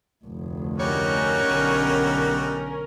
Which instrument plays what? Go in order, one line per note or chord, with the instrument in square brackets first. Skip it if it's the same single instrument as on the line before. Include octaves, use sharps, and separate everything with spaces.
[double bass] F1 D2
[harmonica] G3 D#4 F#4 [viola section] C#4 A#4 [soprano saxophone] C#5
[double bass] B1 D3